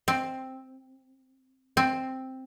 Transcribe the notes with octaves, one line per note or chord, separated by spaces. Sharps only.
C4
C4